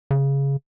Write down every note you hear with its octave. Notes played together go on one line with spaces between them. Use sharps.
C#3